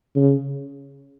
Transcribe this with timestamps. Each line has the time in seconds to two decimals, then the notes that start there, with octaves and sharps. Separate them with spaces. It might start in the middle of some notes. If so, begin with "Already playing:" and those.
0.16 C#3